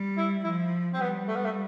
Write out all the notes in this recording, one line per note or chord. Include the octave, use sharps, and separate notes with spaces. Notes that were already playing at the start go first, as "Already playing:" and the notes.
Already playing: G3
E4
F3 E4
C4
G3 B3
A3
B3
A3